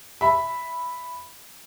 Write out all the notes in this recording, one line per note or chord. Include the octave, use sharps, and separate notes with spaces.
E5 B5